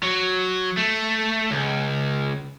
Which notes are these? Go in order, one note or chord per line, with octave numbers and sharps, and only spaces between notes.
F#3
A3
C#2